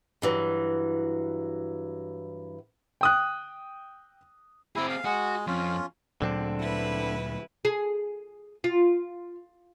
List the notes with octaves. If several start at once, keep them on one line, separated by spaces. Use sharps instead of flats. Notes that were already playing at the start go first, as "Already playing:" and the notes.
G2 E3 F#3
G5 D#6 F#6
C4 E4 G#4
F5
G#3 F#4
F2 C#4 F4
D2 A#2 D3 F#3 C4 D4
E4 B4
G#4
F4